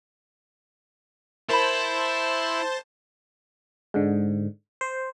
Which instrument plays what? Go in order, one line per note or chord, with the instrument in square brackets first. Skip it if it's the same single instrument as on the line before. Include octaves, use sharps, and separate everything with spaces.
[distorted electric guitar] E4 [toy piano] A#4 B5 [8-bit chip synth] C5 A5
[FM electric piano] G#2 D3
C5